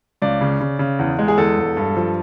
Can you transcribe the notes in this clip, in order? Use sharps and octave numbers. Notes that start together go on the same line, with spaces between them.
C#2 D5
C#3
C#3
C#3
E2
G#3
G#4
E2 A4
E1
G2
F3